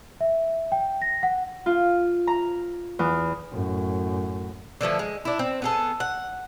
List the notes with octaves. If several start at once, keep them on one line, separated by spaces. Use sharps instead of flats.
E5
G5
A#6
F#5
F4
A#5
E2
F#2 A2
D3 E3 F3 A3
G#3
D4 E4
C4
B3 G#4 A4
F#5